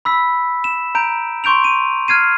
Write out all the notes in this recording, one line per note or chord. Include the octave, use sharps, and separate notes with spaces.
B5 E6 B6
E7
A#5 G6 D7
C6 C#6 G6 D7 F7
D#7
F6 G#6 C7 D#7